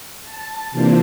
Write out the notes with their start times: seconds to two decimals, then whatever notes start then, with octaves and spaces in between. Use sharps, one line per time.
0.24 A5
0.71 C3 E3 A#3 C4 D4 F4